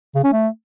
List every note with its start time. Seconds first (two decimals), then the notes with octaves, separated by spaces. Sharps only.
0.15 C#3
0.24 C#4
0.33 A3